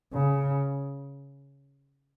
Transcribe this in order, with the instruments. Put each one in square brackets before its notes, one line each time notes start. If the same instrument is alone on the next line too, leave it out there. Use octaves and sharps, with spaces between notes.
[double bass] C#3